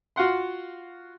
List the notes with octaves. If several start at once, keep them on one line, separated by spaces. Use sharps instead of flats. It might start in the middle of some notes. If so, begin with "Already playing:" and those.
F4 F#4 F5 F#5 C6